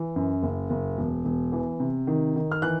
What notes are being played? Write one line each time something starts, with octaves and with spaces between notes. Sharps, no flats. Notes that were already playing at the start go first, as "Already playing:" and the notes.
Already playing: E3
F#2
F#1
F#1
E1
E1
E3
C3
D#3
D#3
F6
E3 F#6